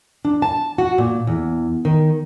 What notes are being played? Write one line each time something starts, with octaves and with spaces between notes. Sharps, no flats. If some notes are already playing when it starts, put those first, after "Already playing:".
D4
A5
F#4
A#2
E2
D#3